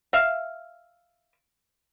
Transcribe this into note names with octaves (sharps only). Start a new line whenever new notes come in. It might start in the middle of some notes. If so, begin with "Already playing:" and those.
E5 F5